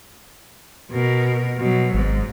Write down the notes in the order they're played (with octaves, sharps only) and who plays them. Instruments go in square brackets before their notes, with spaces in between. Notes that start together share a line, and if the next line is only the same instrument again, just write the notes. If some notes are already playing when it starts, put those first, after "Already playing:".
[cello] B2 A#4
B2 F#3
[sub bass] G#1 [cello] G#2